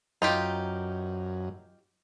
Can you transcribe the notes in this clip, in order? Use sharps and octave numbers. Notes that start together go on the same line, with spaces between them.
F#2 D#4 F4 G4